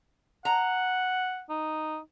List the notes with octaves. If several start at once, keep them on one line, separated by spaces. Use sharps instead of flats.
F#5 A#5
D#4